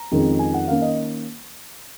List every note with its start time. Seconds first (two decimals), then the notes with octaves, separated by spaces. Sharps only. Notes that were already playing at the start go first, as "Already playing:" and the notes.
Already playing: A#5
0.12 F2 D#3 G#3 C#4
0.39 G#5
0.54 F#5
0.68 D#3 A#3 C#4 F5
0.82 D#5